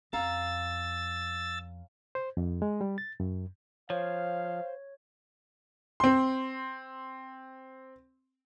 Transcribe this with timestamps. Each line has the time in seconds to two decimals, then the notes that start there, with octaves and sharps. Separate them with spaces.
0.13 F2 C#4 F5 A#5 E6 A6
2.15 C5
2.37 F2
2.62 G#3
2.81 G3
2.98 A6
3.20 F#2
3.90 F3 C5 C#5 F5
6.00 C4 C6